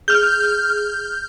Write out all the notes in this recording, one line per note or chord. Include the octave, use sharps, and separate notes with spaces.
G#4 F6 G6